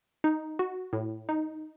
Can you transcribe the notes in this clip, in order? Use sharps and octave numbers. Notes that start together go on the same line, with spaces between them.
D#4
F#4
A2
D#4